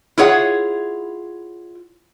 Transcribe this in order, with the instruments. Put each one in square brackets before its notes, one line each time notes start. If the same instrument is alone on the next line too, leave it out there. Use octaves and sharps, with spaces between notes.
[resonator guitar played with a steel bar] E4 F4 G#4 C#5 F#5